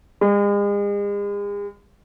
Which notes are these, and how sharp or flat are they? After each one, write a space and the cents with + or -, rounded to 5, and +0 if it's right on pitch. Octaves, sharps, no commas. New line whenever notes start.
G#3 -40